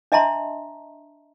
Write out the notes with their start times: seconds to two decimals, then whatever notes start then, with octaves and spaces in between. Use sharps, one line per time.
0.12 D4 D#5 E5 A5 A#5 C6